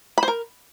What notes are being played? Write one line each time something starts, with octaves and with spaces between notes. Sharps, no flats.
B5
C5
A#4